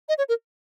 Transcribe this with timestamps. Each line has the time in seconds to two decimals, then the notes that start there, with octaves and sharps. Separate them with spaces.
0.09 D#5
0.18 C#5
0.29 A#4